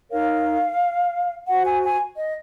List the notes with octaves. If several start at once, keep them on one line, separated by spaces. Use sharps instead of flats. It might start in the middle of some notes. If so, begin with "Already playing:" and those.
D#4 A#4 C#5 F5
F#4 C5 F#5
G#5
G#5
D#5